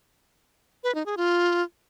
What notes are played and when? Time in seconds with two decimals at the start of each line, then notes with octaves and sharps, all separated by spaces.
0.84 B4
0.95 D#4
1.06 G#4
1.17 F4